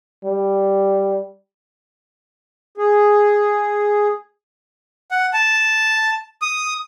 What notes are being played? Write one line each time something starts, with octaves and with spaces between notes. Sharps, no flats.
G3
G#4
F#5
A5
D#6